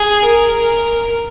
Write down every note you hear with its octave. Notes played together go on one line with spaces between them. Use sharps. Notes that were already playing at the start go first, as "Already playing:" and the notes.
Already playing: G#4
A#4